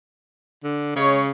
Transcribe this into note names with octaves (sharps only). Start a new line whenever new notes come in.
D3
C#3 G#3 C#5